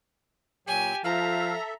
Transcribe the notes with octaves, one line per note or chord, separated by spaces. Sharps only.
A#2 F#3 G4 G#5
F3 A4 E5 F5 A#5